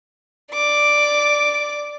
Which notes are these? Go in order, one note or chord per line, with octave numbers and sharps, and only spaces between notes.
D5 D6